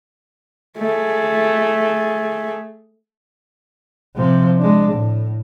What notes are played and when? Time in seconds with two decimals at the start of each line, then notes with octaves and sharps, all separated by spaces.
0.78 A3 G#4
4.16 C3 F3
4.58 G#3 D4
4.92 A2